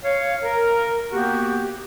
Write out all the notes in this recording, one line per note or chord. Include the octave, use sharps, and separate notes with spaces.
C#5 F5
A#4
A#3 B3 F#4 G4